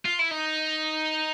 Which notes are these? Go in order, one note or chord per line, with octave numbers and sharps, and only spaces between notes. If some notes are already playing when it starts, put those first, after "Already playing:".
F4
E4
D#4